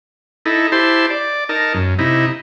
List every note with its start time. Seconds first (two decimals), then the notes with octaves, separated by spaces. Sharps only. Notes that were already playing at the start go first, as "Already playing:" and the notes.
0.46 D#4 E4 A4
0.72 E4 G4 C5 A5 C6
1.10 D5
1.49 D#4 A#4 A5
1.74 F#2
1.99 C3 D#4 E4